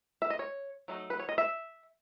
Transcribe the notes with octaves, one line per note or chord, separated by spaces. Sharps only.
E5
D#5
C#5
F#3 A3 D#4
B4
C#5
D#5
E5